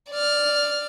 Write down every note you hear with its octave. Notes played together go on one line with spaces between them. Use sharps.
D5 F6